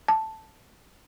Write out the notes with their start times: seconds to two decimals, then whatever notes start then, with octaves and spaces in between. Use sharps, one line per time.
0.08 A5